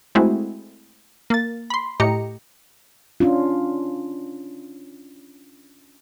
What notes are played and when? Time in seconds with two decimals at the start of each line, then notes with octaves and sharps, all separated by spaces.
0.15 G#3 A3 C4 E4 F#4 G#4
1.30 A#3 A6
1.70 B5 C6
2.00 A2 G4 D#5 A#5 C#7
3.20 C#4 D4 F4